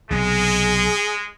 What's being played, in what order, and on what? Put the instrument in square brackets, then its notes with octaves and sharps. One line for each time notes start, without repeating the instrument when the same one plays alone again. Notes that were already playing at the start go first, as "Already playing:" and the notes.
[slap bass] B1 C3 [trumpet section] G#3 [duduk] G#4